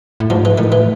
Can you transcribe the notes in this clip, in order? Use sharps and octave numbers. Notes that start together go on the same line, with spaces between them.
A2
G#2 F3
E3
A2 D#3
E3